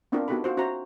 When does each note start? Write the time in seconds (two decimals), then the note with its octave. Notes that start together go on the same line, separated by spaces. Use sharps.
0.12 B3 C4 D4 E4 F4 A#4
0.28 B3 D#4 F#4 G4 A4 B5
0.44 F4 F#4 C5
0.57 C#4 F#4 C5 E5 A#5